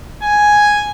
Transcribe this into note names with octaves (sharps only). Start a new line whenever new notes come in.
G#5